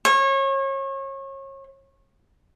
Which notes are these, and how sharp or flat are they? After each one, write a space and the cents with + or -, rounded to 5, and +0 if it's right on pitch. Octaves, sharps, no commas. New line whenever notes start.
C#5 -30